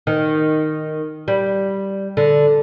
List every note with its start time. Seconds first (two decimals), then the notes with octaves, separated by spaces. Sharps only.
0.07 D#3
1.28 G3
2.17 D3